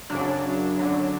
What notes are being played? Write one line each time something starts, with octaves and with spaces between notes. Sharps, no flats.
F#2 C#3 F#3 D4
F#2 D3 F#3